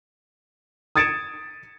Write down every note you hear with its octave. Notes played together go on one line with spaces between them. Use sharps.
D#6 G#6 A6 C#7 D7 E7